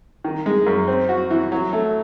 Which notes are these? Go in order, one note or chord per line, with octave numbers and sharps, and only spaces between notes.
D#3
G#3
F#2
C4
F#4
E3
F#3
A3